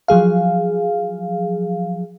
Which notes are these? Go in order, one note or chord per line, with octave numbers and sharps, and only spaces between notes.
F3 F#3 G#4 F5